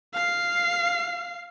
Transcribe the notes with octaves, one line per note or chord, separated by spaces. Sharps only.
F5 C7